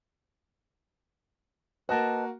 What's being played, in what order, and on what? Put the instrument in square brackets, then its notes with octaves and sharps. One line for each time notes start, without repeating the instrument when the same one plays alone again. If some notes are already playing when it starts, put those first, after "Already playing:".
[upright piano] A#3 F#4 [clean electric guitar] B4 D#5 A5